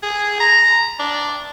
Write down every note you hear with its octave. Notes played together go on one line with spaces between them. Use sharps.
G#4
A#5
D4